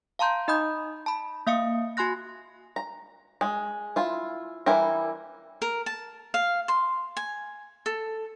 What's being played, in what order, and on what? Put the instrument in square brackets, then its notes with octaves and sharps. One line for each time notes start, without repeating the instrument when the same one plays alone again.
[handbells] F5 A5 A#5 C6 G6
D#4 D#5 B5 D#6 G6
A5 B5
A#3 E5 F5 D#6 C#7
F#4 G#5 C6 F#6 A#6
[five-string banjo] A#5
G#3
E4 F4
E3 G3 E4 A#4
[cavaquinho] A#4
A5
F5
C6
G#5
A4